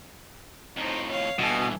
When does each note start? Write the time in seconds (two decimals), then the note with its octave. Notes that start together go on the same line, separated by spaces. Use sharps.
0.77 F2 A2 D#4 C5
1.09 C#5 F5
1.39 G2 B2 E3 A4 G#5